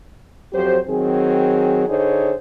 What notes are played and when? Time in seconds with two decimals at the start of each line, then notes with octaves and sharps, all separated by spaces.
0.53 F2 F#3 G4 C5
0.88 D#3 F#3 C4 G#4
1.88 D3 D#4 G#4 C5 C#5